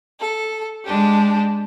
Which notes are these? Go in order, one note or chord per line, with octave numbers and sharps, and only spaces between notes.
A4
G#3 D4 G4